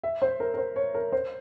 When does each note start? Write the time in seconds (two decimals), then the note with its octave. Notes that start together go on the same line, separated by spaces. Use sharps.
0.03 E5
0.22 C5
0.40 A#4
0.54 A#4
0.58 C5
0.76 C#5
0.94 A#4
1.12 C5